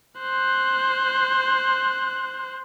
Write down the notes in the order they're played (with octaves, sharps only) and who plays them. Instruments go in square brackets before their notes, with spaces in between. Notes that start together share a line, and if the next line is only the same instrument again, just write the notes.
[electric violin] C5 F#6